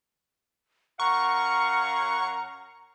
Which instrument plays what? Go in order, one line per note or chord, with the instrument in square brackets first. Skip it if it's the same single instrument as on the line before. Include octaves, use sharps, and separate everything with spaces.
[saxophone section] F#2 F5 F#5 [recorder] A#5 [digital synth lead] C#6